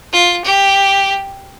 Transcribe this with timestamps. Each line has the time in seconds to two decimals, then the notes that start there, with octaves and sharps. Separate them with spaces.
0.13 F4
0.44 G4